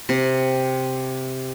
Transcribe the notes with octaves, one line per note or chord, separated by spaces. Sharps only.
C3